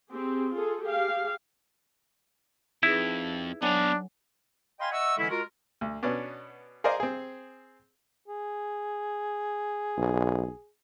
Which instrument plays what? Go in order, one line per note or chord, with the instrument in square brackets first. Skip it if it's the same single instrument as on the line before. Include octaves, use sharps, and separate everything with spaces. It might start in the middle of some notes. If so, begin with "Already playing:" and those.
[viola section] C4 G4 G#4
F4 G#4 A4
G4 G#4 F5
[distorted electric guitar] F2 [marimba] D#4 G#4 B4 [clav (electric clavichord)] E4
[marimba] F#3 C#5 G#5 [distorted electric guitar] B3 F5 [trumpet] D4
[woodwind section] D#5 F5 G5 G#5 B5 C6
D#5 E5 F#5 C#6 E6
D3 E3 G#3 C#4 E4
G#3 F4 F#4 A#4
[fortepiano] D2
B2 B3 C#4 D4
G#4 A#4 C5 D5 D#5 F5
C4 G#4
[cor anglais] G#4
[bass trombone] B1